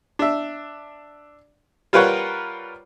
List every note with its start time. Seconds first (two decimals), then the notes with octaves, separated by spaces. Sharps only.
0.19 D4 E5
1.93 G3 F4 A#4 B4 C#5 F#5